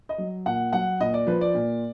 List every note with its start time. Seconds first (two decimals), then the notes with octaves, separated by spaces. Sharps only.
0.09 D#5
0.18 F#3
0.46 A#2 F#5
0.73 F#3 F#5
1.00 A#2 D#5
1.14 D5
1.27 F3 B4
1.41 D5
1.54 A#2